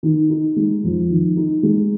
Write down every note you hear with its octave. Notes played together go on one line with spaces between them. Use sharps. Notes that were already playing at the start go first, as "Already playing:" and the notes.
D#3
D#4
G#3
F2
D#3
D#4
G#3